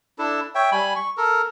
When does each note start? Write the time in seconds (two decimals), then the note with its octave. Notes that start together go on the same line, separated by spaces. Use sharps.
0.18 D4 E4 A4
0.55 C#5 E5 G5
0.72 G3 G#5 B5
0.96 C#6
1.17 A4 A#4